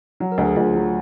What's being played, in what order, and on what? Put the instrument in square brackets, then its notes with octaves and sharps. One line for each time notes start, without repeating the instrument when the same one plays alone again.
[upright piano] F#3
[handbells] A#4
[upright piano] D2
[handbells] G#4
[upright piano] D2 [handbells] F4
[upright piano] F#3